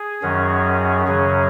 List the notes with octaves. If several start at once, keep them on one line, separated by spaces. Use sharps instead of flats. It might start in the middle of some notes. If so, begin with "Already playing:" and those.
Already playing: G#4
F#2 D#3 F#3 C#4
F#2 C#3 F#3 C#4 G#4